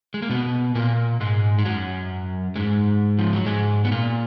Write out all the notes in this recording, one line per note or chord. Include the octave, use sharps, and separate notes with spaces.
G#3
A#3
B2 B3
A#2 A#3
G#2 G#3
G#3
F#2 F#3
G#2 G#3
F3
F#3
G#2 G#3
B3
A#2 A#3